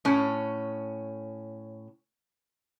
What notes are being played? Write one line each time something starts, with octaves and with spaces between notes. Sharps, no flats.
A2 C#4